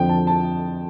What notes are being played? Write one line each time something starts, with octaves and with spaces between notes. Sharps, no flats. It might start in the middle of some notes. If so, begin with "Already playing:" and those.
Already playing: F2 D3 F3 G5
A5
A5